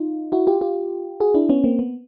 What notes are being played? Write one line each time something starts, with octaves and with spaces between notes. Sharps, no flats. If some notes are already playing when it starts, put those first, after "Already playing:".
Already playing: D#4 F4
E4 F#4
F4 G4
F4 G4
F#4 G#4
D4 E4
B3 C#4
A#3 C4
B3